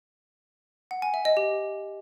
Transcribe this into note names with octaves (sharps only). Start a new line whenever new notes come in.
F#5
G#5
E5
D#5
G4